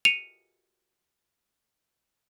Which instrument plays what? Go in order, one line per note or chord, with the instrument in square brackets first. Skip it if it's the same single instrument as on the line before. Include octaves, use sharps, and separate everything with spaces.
[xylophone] C#7 D#7 F7